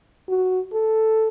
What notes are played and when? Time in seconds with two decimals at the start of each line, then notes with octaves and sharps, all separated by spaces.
0.29 F#4
0.73 A4